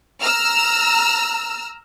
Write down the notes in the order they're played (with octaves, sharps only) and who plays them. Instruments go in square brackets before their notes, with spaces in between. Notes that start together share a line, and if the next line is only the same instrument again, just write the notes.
[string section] A#5 E6 F6